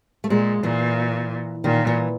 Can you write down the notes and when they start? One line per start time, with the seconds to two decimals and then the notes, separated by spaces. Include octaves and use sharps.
0.24 A3
0.29 A#2 G#3
0.63 A#2 E3
1.64 A#2 D#3
1.87 E3